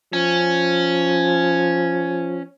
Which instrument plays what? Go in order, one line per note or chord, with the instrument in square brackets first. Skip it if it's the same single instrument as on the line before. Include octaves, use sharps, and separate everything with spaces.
[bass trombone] F3 [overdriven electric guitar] C#4